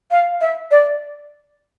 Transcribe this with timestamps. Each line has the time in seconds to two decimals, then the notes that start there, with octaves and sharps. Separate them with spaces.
0.11 F5
0.41 E5
0.71 D5